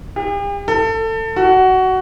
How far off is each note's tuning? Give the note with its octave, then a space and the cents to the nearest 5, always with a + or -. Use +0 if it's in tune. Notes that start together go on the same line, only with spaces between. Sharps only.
G4 +45
A4 +25
F#4 +15